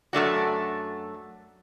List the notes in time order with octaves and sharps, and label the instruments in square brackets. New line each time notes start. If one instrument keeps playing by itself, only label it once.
[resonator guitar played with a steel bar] F#2 A3 D4 F#4